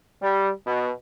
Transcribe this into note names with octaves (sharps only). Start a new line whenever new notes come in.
G3
B2